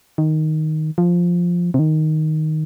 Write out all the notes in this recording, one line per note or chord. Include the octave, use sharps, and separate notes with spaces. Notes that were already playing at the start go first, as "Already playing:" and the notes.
D#3
F3
C3
D#3